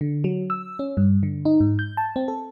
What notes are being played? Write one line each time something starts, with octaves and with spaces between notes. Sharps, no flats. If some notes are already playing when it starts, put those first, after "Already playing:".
D3
F#3
E6
C#4
G2
D3
D#4
G#2
G6
A5
C4
A4